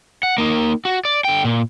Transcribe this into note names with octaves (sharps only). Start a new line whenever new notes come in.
F#5
A#3 D#4
F#4
D5
D3 G5
A#2